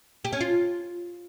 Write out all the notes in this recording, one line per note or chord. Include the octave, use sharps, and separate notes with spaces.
G4
C#4
F4